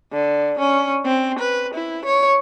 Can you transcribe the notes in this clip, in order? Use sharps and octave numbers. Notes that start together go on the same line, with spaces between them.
D3
C#4
C4
B4
E4
C#5